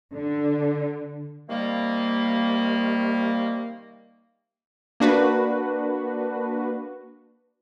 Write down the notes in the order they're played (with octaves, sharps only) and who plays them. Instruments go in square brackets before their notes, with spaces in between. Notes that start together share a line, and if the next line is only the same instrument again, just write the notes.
[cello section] D3
[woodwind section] C3 D#3 G3 A#3
[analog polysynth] A#3 D4 F#4 B4